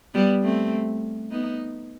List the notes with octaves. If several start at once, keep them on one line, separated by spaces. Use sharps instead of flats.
G3 B3
A3 C4
B3 D#4